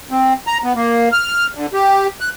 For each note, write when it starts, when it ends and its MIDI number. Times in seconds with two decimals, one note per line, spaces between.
0.11 0.33 60
0.47 0.58 82
0.64 0.73 59
0.75 1.09 58
1.12 1.47 89
1.55 1.66 50
1.74 2.07 67
2.20 2.29 90